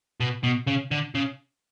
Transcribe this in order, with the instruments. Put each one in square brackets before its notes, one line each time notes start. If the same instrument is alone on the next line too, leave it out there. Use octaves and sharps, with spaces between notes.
[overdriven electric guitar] B2
B2
C#3
D3
C#3